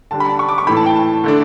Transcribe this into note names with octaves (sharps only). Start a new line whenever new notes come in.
D3 G3 D4 A5
B5
A5
C#6
D6
C#6
A2 E3 A3 B5
A5
G5
A5
D3 A3 D4